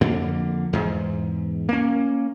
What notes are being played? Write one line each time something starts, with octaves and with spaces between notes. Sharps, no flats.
F2 D3 A#3
E2 G#2
A#3 C#4